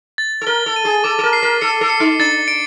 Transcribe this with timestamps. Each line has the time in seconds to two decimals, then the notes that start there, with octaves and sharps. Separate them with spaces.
0.18 A6
0.41 A4
0.47 A#4 G7
0.66 A4
0.76 D#7
0.85 G#4
1.04 A4 D6
1.19 A4
1.23 A#4
1.33 C7
1.43 A#4
1.61 A4 C#7
1.81 A4
1.90 C#7
2.00 D#4
2.19 D4 A6
2.48 D7